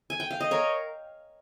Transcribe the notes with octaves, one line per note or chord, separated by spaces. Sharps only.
G#5
G5
F5
D#5
A#4 C#5